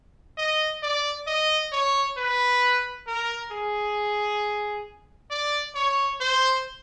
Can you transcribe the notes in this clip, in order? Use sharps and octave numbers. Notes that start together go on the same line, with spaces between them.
D#5
D5
D#5
C#5
B4
A#4
G#4
D5
C#5
C5